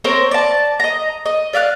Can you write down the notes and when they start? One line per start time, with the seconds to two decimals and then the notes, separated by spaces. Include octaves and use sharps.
0.04 C4 A#4 C5 C#5
0.31 D5 A5
0.80 D#5 A#5
1.26 D#5
1.53 D5 E5 F5 F#6